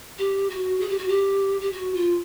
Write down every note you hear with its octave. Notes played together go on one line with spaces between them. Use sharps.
G4
F#4
G#4
G4
F#4
G4
G4
F#4
F4